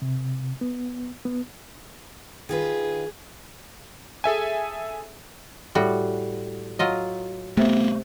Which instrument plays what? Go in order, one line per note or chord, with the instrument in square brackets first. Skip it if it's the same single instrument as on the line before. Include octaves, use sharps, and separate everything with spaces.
[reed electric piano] C3
B3
B3
[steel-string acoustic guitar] D#3 F4 B4 [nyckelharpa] G#4
[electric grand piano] G#4 A4 E5 G#5
[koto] A2 G3 F#4
F#3 F4 D#5
[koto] C3 [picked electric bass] A3 B3